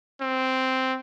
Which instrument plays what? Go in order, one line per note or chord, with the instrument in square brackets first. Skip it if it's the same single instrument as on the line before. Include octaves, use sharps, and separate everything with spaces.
[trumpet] C4